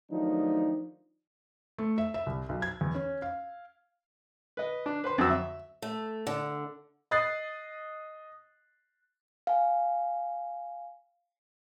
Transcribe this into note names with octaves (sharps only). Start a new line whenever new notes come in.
D#3 F3 F#3 A3 D4 D#4
A3
E5
E5
C2
B1
G#6
E2
C#4
F5
B4 D#5
D4
B4 C5 C6
F2 F#3 E6
E5
A3
D3
D#5 D#6 F#6 A6 C7
F5 G#5